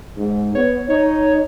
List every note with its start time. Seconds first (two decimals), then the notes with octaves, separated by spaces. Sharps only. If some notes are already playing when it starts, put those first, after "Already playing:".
0.17 G#2
0.55 B3 C#5
0.90 D#4 C#5